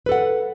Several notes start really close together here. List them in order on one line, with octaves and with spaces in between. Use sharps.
B4 A4 F#5